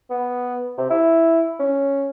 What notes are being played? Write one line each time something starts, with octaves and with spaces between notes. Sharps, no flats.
B3
C3
E4
C#4